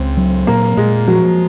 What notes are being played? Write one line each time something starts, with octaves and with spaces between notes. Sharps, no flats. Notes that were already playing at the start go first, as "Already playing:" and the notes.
Already playing: C#2 C4
F#3
A#2 A#3
A#2 G#3
F3 F#3